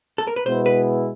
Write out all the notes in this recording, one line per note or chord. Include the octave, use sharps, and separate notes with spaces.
A4
A#4
B4
B2 G#3 B3 E4 C5
B4